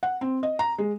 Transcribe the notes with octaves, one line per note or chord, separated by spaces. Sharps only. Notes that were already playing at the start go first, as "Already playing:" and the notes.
F#5
C4
D#5
A#5
G#3